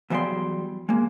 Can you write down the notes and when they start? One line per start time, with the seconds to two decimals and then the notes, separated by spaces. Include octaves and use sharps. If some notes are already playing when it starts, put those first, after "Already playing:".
0.10 E2 F#3 G3 E5 G5 C6
0.89 G#3 A#3